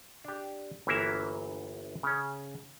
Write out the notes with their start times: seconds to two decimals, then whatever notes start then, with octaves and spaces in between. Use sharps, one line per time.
0.24 D4 G4
0.87 G1 E3 F#3 A#3 E4 E5
2.03 C#3 C#4